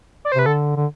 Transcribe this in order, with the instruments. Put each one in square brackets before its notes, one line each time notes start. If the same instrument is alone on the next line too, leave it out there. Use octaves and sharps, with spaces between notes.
[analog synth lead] D5
C5
[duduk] C3 [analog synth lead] B4
[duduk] D3 [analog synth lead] A4
[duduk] D3